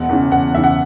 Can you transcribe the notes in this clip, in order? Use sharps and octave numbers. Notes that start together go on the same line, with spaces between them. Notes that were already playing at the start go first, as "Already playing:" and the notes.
Already playing: E1 F#5
E2 C#3
E1 F#5
E2 C#3 E5
F#5